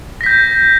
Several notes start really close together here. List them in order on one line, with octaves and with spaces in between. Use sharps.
A#6 B6 G6